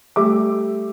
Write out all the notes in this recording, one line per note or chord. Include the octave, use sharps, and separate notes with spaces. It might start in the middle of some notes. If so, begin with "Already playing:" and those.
G3 A3 E5 D6